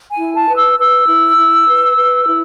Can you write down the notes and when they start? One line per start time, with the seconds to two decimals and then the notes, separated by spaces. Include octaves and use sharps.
0.11 G#5
0.19 E4
0.33 A5
0.48 B4
0.56 E6
0.78 B4 E6
1.08 E4
1.38 E4
1.67 B4
1.97 B4
2.27 E4